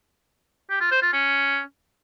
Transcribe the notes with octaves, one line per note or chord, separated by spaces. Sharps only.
G4
F4
C5
F4
C#4